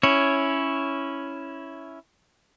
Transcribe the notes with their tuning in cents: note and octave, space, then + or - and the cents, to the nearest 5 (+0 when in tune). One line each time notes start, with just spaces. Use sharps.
C#4 +0 E4 +0 C#5 +0